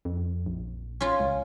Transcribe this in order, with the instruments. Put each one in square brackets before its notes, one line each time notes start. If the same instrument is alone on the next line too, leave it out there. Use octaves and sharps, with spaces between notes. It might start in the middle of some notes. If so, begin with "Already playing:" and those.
[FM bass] F2
A#1
[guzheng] C#4 F4
[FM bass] C#2